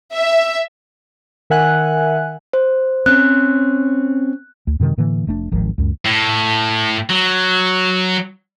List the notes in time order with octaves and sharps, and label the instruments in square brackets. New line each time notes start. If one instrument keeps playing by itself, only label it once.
[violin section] E5
[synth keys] D#3 A#4 E5 F#5 G#5 F#6
[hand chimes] C5
[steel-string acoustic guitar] C4 C#4 [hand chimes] F#6
[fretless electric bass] D2
F#2 C3 D#3 G#3
A2 D3 E3 A#3
F1 A3 D4
D1 G#1 D#3 F3
C#2 F#2
[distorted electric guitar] A2
F#3